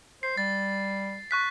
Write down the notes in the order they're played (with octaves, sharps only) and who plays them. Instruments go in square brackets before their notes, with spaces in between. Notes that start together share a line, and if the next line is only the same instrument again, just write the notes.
[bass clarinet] C5 [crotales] C7
[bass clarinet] G3 [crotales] A6
[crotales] C#6 F#6 B6